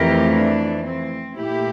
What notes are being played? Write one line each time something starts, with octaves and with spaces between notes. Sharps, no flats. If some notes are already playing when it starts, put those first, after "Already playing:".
Already playing: F2 E3 A3 G4 A#4
D4
C4
A#2 A3 E4 G4